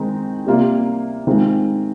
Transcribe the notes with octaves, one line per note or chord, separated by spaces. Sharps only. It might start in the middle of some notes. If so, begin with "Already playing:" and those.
Already playing: D#3 G#3 C4 D#4
C3 G3 A#3 F4
D#3 G#3 C4 F4